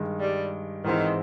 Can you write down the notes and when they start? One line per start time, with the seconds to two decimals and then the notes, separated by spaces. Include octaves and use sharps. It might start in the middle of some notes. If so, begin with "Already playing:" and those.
Already playing: G2 D#3 G#3
0.20 G3
0.84 G#2 D#3 E3 G#3 C4 E4